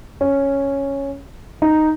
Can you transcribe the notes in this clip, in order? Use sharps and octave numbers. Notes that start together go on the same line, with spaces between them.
C#4
D#4